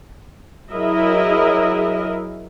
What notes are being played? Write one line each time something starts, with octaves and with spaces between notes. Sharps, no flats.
F#3 E4 G#4 A#4 D#5 E5